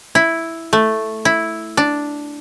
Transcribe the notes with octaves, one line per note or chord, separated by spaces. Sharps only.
E4
A3
E4
D4